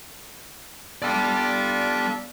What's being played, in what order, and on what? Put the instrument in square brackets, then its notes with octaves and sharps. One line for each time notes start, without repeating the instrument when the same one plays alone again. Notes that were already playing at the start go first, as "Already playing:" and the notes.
[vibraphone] B3 [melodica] D4 F4 A4 [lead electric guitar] D5 G5